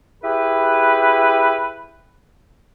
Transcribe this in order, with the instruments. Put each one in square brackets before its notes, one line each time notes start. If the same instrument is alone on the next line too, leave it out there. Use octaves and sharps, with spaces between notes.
[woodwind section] E4 G4 G#4 B4